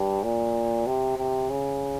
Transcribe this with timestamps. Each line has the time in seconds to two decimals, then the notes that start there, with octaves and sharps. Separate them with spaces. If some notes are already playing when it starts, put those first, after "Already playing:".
Already playing: G2
0.24 A#2
0.87 C3
1.18 C3
1.50 C#3